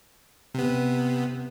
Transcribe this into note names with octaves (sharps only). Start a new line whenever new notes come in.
C3 B3